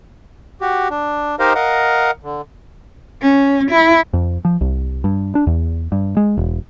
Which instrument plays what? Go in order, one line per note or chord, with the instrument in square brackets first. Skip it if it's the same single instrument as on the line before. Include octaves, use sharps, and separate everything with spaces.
[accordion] F#4 G4
D4
D#4 G4 A#4 C5 D#5 F5
A#4 D#5 F5 F#5
D3
[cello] C#4
E4
[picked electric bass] F2
F3
C2
G2
D4
E2
G2
G#3
E1